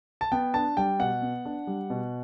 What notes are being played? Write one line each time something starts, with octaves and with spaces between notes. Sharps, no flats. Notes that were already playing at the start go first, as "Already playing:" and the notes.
A5
B3 G5
D4 A5
G3 G5
B2 F#5
B3
D4
G3
B2